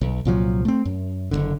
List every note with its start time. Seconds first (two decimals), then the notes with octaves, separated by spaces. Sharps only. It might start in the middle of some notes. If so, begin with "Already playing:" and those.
0.01 B1
0.25 C2 A#2 F3 F#3
0.65 A3 C4
0.85 F#2
1.31 F#1 C2 D3